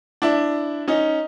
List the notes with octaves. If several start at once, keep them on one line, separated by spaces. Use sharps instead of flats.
D4 E4
C#4 D#4